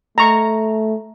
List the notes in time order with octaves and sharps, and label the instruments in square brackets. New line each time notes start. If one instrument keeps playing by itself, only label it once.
[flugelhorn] A3 [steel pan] A#5 C#6